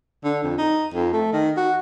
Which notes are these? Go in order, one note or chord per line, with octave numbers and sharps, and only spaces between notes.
D3
F2
D#4
F2
A3
D#3
F#4